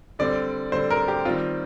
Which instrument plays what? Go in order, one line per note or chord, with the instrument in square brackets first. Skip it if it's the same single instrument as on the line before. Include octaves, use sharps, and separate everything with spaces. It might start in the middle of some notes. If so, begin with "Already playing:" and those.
[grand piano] D3 G3 C4 [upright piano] D5
[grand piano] D3 G3 C4 [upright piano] C5
[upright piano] A#4
G4
[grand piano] D#3 G3 C4 [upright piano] F4